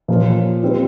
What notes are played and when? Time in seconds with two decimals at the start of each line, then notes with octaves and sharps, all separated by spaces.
0.08 A#2 F3 A#3 C#4 F4
0.62 G3 C4 F4